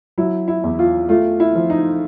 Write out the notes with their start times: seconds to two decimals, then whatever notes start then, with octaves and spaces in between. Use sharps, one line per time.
0.18 F#3 E4
0.48 E4
0.63 E2
0.79 F4
1.09 A3 F4
1.40 E4
1.55 F3
1.70 D#4